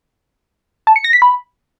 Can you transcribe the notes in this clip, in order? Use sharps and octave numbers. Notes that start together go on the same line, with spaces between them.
A5
C#7
A#6
B6
B5